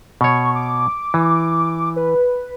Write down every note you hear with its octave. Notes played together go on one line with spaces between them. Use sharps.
B2 C#5 C#6
D6
E3
B4